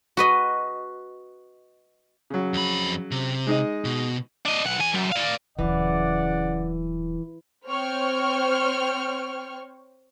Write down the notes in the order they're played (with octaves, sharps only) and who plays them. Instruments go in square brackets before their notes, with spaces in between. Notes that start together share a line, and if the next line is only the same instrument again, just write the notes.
[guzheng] F#4 B4 D#5
[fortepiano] C#3 F#3
[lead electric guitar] F2 B5
C3
[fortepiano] G#3 D#4 D#5
[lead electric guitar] B2
[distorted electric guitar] D4 D#5
B1 F#5
E2 G#5
F#2
D5 F5
[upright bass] D#1 F#3 [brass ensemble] C#3 D5 F#5 [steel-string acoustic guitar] E3
[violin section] C4 C5 C#5 G5 C#6 F6